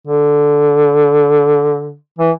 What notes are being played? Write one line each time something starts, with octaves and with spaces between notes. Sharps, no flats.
D3
E3